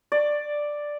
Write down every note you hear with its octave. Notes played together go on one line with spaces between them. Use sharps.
D5